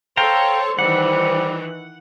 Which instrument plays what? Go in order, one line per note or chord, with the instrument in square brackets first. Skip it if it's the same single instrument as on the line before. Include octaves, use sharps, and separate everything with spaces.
[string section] A4 C#5 [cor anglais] C5 [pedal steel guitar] F5 G5 A#5
[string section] D#3 E3 [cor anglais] G3 [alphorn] C5 [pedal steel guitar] F#5